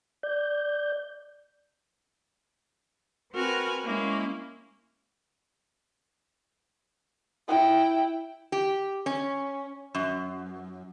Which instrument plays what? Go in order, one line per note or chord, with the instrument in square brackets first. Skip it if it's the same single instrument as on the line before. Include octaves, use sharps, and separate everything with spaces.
[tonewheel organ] D5 G6
[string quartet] C4 F#4 A#4 B4 G#5
G#3 A#3 C#4 E4
[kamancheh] E4 G5
[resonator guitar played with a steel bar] G4
C#4
F#2